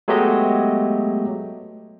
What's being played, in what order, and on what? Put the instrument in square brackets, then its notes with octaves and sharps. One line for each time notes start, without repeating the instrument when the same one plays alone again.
[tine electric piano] F#3 G#3 A3 B3 G4 D#5